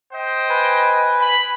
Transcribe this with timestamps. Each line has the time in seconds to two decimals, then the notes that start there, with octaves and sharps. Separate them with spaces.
0.13 C5 D#5 G5
0.50 B4 G#5
1.22 B5